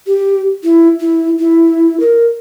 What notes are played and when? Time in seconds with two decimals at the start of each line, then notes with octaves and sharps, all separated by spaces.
0.07 G4
0.64 E4
1.00 E4
1.39 E4
2.00 A#4